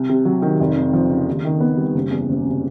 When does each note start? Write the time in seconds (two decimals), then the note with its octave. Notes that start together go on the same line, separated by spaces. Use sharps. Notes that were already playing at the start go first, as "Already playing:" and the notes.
Already playing: C2
0.09 C3
0.25 F#3
0.42 D#3
0.60 F1
0.76 F2
0.93 F3
1.10 C#3
1.28 D#2
1.45 D#3
1.60 B3
1.78 G3
1.94 F#1
2.11 E2
2.29 F#1
2.45 C3